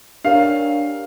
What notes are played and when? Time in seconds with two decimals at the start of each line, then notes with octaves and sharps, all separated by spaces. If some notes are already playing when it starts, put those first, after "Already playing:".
0.25 D4 G4 A#4 C#5 F5